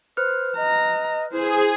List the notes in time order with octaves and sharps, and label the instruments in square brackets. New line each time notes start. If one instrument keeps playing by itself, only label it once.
[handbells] B4 F6 [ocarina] C5
[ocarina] D#5 [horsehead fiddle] A#5
[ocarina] E4 [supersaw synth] G#4 [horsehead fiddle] C5